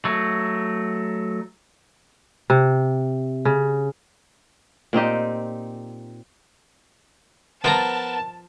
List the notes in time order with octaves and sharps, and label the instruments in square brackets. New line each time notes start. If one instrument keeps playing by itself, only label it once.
[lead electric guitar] F#3 A3
[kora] C3
C#3
A#2 C4 D#4 G4
[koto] F3 F4 A#5 [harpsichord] B3 A#4 [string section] A5